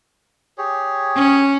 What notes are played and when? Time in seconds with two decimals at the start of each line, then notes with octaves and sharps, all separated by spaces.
0.58 G4 G#4 C#5
1.16 C#4